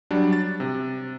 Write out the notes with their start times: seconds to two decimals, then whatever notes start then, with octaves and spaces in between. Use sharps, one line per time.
0.11 F#3 G3 D4
0.33 A6
0.60 C3